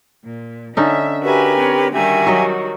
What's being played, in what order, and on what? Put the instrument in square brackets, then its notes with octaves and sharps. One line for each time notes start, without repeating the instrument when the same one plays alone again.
[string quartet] A#2
[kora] D3 C#4 D#4 [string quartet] E5
[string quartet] F#4 E5 G#5 [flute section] G4 A#4 B4
[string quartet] C4 C#5
[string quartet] D#3 G3 F#4 [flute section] G4 E5 G#5
[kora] F#3 D#5